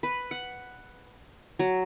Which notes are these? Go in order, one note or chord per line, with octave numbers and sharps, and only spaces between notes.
B4
F#5
F#3